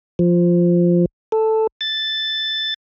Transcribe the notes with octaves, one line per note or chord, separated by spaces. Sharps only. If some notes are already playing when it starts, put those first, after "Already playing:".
F3
A4
A6